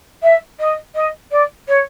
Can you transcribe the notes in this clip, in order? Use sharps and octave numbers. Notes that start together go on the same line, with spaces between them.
E5
D#5
D#5
D5
C#5